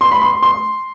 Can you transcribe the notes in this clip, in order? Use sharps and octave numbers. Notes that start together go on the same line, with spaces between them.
C6
B5
C6
C6